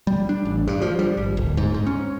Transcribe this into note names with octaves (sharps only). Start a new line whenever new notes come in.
G3
D4
A1
G2
F3
G3
G#1
D1
G#2
G#2
C#4